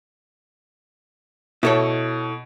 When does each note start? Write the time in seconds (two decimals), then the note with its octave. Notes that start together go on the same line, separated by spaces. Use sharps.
1.63 B2 E4 A4 C#5